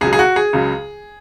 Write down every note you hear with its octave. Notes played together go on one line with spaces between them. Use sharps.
C#2 C#3 F#3 G#4
G#4
F#4
G#4
C#2 C#3 F#3